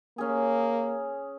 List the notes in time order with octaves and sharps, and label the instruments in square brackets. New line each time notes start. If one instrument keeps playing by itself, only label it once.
[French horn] A#3 [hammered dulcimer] C#4 G#4